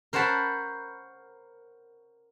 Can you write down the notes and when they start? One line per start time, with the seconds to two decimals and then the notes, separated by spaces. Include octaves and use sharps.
0.13 A#4 C5 C#5 F#5 A5 B5